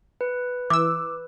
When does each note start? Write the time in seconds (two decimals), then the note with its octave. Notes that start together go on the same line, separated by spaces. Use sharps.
0.21 B4
0.70 E3 D6 E6